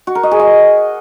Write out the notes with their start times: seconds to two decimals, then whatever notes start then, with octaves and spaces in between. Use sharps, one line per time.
0.07 F#4
0.15 A#4
0.23 D#5
0.31 G#4
0.40 D#5